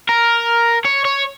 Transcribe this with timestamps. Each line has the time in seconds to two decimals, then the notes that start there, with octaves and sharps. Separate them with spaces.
0.09 A#4
0.85 C#5
1.05 C#5